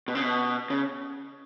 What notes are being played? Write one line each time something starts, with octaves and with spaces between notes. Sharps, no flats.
B2
C#3
B2
C#3